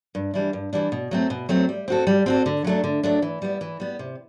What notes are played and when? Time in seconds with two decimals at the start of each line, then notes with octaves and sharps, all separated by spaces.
0.15 G2
0.34 E3 G3 D4
0.53 G2
0.73 E3 G3 D4
0.92 B2
1.11 F#3 A3 C4
1.30 B2
1.49 F#3 A3 C4
1.69 G3
1.88 C4 F#4 A4
2.07 G3
2.26 C4 F#4 A4
2.46 D3
2.65 F#3 A3 D4
2.84 D3
3.03 F#3 A3 D4
3.22 E3
3.42 G3 B3
3.61 E3
3.80 G3 B3
3.99 C3